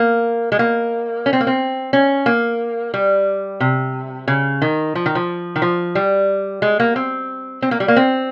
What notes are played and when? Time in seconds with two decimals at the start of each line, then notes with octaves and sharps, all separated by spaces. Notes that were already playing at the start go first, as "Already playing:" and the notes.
Already playing: A#3
0.52 G#3
0.59 A#3
1.26 C#4
1.33 C4
1.41 A#3
1.47 C4
1.93 C#4
2.26 A#3
2.94 G3
3.60 C3
4.28 C#3
4.62 D#3
4.95 F3
5.06 D#3
5.15 F3
5.56 D#3
5.62 F3
5.95 G3
6.62 G#3
6.80 A#3
6.96 C4
7.62 C4
7.71 A#3
7.80 G3
7.88 A#3
7.96 C4